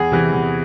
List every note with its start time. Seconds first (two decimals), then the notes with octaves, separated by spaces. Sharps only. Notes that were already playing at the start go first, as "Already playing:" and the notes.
Already playing: E2 G#4
0.12 C3 E3
0.32 E2